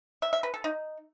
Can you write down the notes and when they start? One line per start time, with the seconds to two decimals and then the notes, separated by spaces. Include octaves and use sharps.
0.22 E5
0.33 E5
0.43 B4
0.54 A4
0.64 D#4